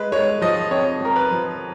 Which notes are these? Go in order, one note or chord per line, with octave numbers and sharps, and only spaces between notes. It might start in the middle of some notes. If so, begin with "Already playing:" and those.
Already playing: G#3 B4
G#3 C#5
F3 D#5
F2 C#5
F2 A#4
B4
F3